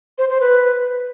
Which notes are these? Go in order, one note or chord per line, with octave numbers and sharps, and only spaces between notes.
C5
C5
B4